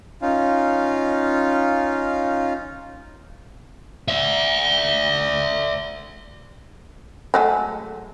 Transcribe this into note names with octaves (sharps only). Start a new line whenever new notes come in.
C#4 D#4 F4 F5
D5 E5
F#3 G#3 A3